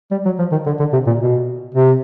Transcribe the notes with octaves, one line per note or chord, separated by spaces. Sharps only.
G3
F#3
F3
D#3
D3
D3
C3
A#2
B2
C3